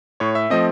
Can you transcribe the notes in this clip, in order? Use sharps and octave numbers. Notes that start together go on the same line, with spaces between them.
A2 C#5
E5
F3 A3 C4 D#5